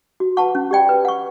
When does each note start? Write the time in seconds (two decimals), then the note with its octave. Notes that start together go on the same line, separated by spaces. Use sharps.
0.20 F#4
0.37 B4 F#5 A5 C#6
0.55 C#4
0.71 G4 D5 G5 B5
0.89 B4
1.05 F#5 C#6